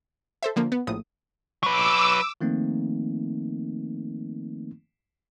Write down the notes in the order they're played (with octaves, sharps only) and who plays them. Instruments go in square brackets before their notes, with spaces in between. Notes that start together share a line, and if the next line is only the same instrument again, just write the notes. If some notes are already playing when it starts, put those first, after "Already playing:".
[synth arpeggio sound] A4 C5 E5
D3 F3 A#3
B3
A#1 A2 D#6
[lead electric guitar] F#3 B4 [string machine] D6 E6
[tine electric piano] D#3 F3 A3 A#3 C4 D#4